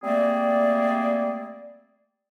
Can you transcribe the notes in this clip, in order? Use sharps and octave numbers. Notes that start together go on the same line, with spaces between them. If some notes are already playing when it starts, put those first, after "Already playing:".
G3 A3 A#3 C4 G#4 D5